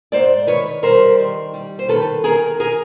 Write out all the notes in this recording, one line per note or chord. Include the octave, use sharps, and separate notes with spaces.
G#2 C5 D5
D#3 B4 C#5
G3 A#4 C5
D#3
G3
C5
D#3 A4 B4
D#3 G#4 A#4
G#4 A#4